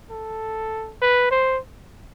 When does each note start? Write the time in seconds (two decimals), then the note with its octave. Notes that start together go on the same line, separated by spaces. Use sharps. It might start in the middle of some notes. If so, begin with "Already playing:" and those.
0.11 A4
1.02 B4
1.31 C5